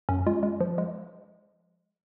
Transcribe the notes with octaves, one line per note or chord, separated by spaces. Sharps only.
F#2 C#4
G#3 F4
G#3
F3
G#3